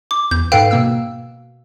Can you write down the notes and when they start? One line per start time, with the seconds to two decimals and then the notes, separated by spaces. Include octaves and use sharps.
0.11 D6
0.31 E2 G6
0.52 G#2 A4 B4 F5 G5 C7
0.71 B2 A#3 E6